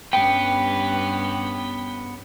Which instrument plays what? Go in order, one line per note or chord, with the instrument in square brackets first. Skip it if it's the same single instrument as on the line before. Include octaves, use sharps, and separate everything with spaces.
[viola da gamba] G2 G3 C#4 [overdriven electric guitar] B3 [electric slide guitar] G5